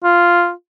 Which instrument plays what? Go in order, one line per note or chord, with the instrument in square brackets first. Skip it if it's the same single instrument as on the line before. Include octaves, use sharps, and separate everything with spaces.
[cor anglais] F4